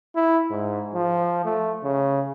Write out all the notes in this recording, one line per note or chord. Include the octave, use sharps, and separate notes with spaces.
E4
G#2
F3
A3
C#3